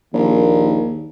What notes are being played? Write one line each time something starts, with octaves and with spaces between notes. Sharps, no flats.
A#1 D#2